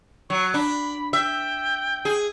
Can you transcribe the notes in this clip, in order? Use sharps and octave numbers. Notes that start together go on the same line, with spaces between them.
F#3 C#6
D4 B5
E5 G5
G#4